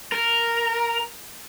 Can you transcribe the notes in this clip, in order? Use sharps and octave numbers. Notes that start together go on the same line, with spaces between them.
A#4